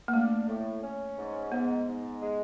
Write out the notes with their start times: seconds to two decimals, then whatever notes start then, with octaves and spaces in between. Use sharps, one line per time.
0.08 A#3
0.13 A3 D4
0.48 A2
0.82 C#4
1.17 G#2
1.52 G#2 B3
1.87 G#2
2.22 G#3